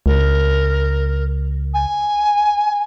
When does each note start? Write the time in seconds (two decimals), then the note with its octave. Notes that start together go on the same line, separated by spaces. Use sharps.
0.06 C#2 A#4
1.73 G#5